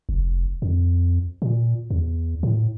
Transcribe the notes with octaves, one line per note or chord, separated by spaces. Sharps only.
F1
F2
A#2
E2
A2